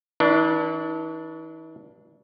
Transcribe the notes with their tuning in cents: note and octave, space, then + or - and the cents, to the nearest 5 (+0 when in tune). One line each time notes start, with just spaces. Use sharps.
E3 -45 D4 +0